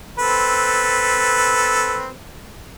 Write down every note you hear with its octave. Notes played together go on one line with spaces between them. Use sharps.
C4 A4 B4